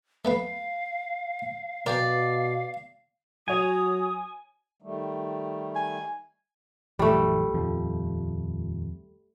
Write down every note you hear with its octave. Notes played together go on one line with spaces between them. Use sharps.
A3 B3 B4 F5
B2 A#4 D5 F5 G5 G#5
F#3 F#4 C#5 G#5 D#6
D#3 G3 A3
G#5
A#1 F#2 E3 G3 A3
D#1 F2 F3